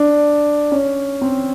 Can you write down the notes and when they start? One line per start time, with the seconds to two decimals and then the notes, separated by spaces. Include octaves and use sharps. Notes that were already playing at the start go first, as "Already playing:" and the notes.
Already playing: D4
0.72 C#4
1.22 C4